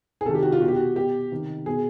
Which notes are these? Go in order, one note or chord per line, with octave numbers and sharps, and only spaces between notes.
G#4
C3 D#3 A4
G4
F#4
F4
B2 F#4
G4
F#4
B2 G4
C3 D#3
B2 G#4